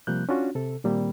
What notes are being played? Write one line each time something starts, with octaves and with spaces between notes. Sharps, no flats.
C3 F3 G3 A#3 F#6 G6
C#4 D4 F4 F#4
C3 A4
A#2 D#3 G3 A#3 C4